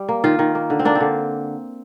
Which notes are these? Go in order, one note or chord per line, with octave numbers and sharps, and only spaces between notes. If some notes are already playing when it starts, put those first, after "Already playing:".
Already playing: G3
A#3
D#3 F4
D#3
A#3
D3
C4
A#3 D4
C4
D3